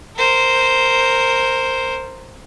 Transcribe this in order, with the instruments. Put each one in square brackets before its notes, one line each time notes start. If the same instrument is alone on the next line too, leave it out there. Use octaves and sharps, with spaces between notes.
[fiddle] A#4 C5